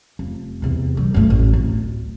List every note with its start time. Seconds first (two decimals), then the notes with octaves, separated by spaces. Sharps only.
0.19 F1
0.62 E2 C3
0.97 G3
1.14 F#1 A3
1.30 A1
1.53 D1